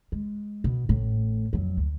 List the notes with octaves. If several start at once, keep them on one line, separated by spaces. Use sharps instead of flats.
G#3
B2
A1 A2
F2 F#3
D2